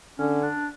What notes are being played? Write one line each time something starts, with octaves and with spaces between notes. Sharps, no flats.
D3 C#4
D4